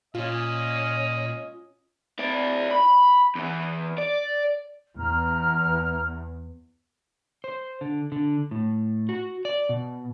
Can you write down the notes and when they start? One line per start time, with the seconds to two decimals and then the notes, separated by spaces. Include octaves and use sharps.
0.15 A#2 C#4 F4 D#5
2.19 E4 D5
2.71 B5
3.35 E2 E3
3.98 D5
4.96 E2 A#5 F6
7.44 C5
7.81 D3
8.12 D3
8.51 A2
9.09 F#4
9.45 D5
9.69 B2